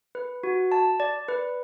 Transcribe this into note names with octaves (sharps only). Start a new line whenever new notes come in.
B4
F#4
A5
D5
B4